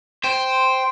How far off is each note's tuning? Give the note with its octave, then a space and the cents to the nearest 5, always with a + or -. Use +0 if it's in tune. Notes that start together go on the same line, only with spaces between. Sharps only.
C5 +0 G5 +0